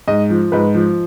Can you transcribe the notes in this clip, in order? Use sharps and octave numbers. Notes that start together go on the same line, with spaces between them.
G#2 D#5
F3
G#2 B4
F3